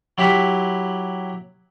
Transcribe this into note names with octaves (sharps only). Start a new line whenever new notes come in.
F#3 E4 G4 B5